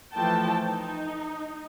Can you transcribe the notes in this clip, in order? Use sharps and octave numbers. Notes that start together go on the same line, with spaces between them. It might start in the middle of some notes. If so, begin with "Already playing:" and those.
E3 F3 A3 G5 A5
D#4